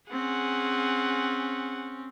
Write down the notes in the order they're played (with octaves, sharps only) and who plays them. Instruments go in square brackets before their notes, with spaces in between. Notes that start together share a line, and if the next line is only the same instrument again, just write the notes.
[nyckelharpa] C4 C#4 [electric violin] G#4 F#5